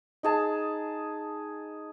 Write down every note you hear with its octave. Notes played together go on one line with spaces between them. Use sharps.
D#4 G#4 A5